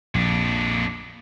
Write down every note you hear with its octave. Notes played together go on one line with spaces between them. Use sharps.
A#1 F2 D4